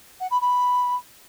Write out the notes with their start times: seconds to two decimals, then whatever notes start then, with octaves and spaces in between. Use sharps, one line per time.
0.20 F#5
0.31 B5
0.41 B5